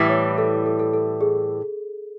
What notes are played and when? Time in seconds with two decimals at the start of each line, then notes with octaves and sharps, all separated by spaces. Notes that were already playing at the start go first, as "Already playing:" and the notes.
Already playing: A2 E3 G3
0.09 C#5
0.38 A4
0.66 A4
0.80 A4
0.93 A4
1.21 G#4